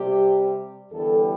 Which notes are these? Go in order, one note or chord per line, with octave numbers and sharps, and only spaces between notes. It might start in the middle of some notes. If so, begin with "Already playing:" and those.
Already playing: C3 G3 G4
E2 D3 G3 A4